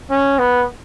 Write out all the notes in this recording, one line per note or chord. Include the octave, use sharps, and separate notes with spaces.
C#4
B3